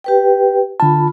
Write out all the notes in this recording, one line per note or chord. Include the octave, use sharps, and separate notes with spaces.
G4 B4 G5
D3 F4 A5 B5